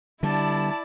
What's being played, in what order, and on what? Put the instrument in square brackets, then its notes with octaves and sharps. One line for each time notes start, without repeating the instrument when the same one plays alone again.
[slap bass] D3 G3 [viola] E4 D5 [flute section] A5